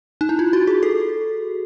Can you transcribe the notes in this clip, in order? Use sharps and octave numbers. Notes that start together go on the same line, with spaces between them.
D#4
E4
F4
F#4
G#4
A4